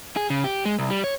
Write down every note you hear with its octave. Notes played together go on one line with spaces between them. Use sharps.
G#4
C#3
G4
G#3
C2
G3
C#5